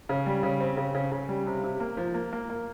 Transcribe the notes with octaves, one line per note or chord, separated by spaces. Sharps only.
C#3
G3
C#3
C4
C#3
C#3
C#3
G3
C3
C3
A#3
F3
A#3
A#3
A#3